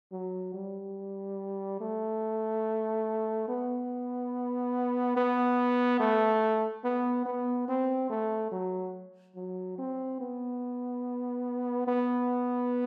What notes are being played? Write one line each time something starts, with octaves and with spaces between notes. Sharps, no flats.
F#3
G3
A3
B3
B3
A3
B3
B3
C4
A3
F#3
F#3
C4
B3
B3